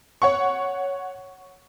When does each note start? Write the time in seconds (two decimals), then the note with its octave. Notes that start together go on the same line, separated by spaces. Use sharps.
0.22 C#5 F#5 C#6